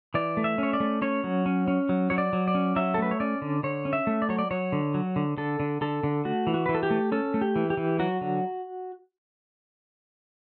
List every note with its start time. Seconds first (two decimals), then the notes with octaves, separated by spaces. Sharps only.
0.14 E3 D5
0.37 A3
0.44 E5
0.58 C#4 C#5
0.73 D5
0.80 A3
1.02 C#4 C#5
1.24 F#3
1.46 C#4
1.68 C#4
1.89 F#3
2.10 F#3 C#5
2.18 D5
2.33 F#3
2.48 D5
2.55 C#4
2.76 F#3 E5
2.94 A4
2.98 A3 B4
3.11 C#5
3.20 C#4 D5
3.42 D3
3.63 D3 C#5
3.85 C#4
3.93 E5
4.07 A3
4.22 D5
4.29 F#3 C#5
4.39 D5
4.51 F#3 C#5
4.72 D3
4.94 F#3
5.16 D3
5.38 D3 A4
5.60 D3
5.81 D3 A4
6.03 D3
6.25 A3 F#4
6.47 E3
6.54 F#4
6.66 E3 B4
6.75 A4
6.83 G4
6.90 A3
7.12 C#4 A4
7.34 A3
7.41 G4
7.56 E3
7.70 G4
7.77 E3
7.99 F#3 F#4
8.21 D3